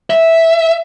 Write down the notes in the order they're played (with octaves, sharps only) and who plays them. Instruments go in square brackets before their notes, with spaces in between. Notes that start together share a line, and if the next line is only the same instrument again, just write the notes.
[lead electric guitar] E5